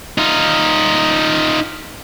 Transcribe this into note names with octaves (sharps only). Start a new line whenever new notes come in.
D#4 F4